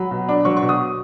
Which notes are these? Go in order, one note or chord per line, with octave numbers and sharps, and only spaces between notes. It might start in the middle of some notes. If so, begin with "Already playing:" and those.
Already playing: F#3 B5
B2
D4
F#3 C#6
C#6
B2
D#6